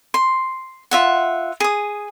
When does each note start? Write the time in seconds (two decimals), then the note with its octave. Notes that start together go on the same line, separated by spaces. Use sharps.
0.14 C6
0.91 F4 E5 F#5
1.60 G#4 D#6